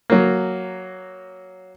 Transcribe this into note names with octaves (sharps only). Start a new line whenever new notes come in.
F#3 A#3